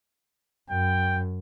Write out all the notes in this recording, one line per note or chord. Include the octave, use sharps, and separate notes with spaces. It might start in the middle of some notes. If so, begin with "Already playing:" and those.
F#2 G5